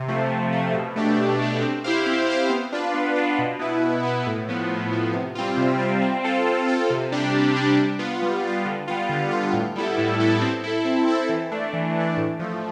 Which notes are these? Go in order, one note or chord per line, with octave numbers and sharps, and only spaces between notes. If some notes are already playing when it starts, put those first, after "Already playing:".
Already playing: C3
F3 A3
C3
F3 A3
B2
A3 D4 G4
B2
A3 D4 G4
C4
E4 G4 C5 F5
C4
E4 G4 C5 F5
B3
D4 F4 B4
B3
D4 F4 B4
B2
B3 E4 B4
B2
B3 E4 B4
A2
F3 B3
A2
F3 B3
C3
G3 C4 F4
C3
G3 C4 F4
C4
F4 A4
C4
F4 A4
C3
G3 D4 G4
C3
G3 D4 G4
G3
B3 F4
G3
B3 F4
D3
G3 B3 F4
D3
G3 B3 F4
A2
G3 B3 E4 A4
A2
G3 B3 E4 A4
C4
E4 A4
C4
E4 A4
E3
A3 D4
E3
A3 D4
A2
F3 A3